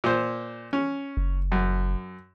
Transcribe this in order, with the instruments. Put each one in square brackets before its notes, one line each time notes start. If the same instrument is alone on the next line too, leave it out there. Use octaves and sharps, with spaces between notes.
[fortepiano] A#2 C5
C#4
[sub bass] F#1
[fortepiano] F#2